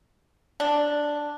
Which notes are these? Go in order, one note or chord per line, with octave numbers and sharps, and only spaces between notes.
D4